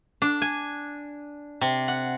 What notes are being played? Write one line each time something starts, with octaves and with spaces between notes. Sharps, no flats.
D4
G#5
C3
F#5